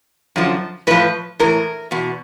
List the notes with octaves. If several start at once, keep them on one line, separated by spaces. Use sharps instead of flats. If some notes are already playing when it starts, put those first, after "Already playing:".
F#2 D3 F3
A2 F3 B4
A2 E3 A#4
E2 B2